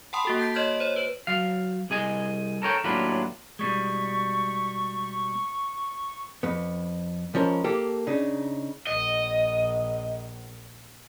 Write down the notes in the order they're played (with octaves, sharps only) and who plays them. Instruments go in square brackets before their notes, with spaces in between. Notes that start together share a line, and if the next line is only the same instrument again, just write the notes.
[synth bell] F#5 G5 A5 B5 C6 D#6
A#3 F#4 A4
A5 G6 B6 D7
C#5 D#5 C6 F6 G6 G#6
C5 C#5
B4 F#7
[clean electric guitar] F#3 F5
C2 G#4 D#5 G#5
A4 A#4 C#5 G5
D#2 A2 F#3 D4 F4 B4
[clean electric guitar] B2 G3 G#3 [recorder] C#6
[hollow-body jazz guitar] F2 B3
C#2 F3 C#4 A#4
A#3 G4 A4
C#3 D4 D#4
[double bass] A#1 [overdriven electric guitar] D#5